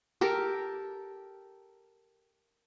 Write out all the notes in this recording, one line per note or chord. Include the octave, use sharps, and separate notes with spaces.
G4 A4 A#4